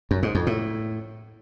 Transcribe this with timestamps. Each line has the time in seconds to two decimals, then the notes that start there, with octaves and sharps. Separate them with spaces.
0.11 F#2
0.23 G#2
0.35 F2
0.47 A2